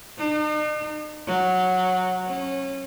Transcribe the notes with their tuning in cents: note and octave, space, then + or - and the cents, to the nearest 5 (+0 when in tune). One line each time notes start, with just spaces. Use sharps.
D#4 -45
F#3 -10
C#4 -25